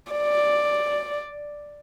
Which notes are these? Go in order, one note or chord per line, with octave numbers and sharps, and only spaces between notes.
D5